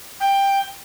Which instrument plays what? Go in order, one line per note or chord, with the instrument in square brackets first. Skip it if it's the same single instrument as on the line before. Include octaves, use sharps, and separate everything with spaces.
[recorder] G5